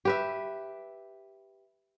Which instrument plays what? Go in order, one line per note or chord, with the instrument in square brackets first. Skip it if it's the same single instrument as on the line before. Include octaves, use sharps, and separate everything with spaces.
[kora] G4 B4 E5